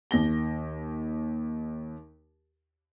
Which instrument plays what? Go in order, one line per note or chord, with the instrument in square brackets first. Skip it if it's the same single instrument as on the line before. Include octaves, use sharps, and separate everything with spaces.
[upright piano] D#2 A#6 G7